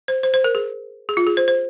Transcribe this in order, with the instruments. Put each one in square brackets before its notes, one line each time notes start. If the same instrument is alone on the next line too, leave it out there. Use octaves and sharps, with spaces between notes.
[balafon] C5
C5
C5
A#4
G#4
G#4
F4
G#4
C5
C5